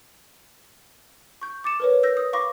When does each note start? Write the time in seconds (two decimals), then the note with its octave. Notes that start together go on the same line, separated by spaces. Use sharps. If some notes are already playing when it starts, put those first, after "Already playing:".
1.41 C#6 G6
1.64 D6 A6 C#7 E7
1.80 A#4 B4 C#5
2.03 E6 G6 A#6
2.17 D#6
2.33 F5 B5 C#6 D6 A#6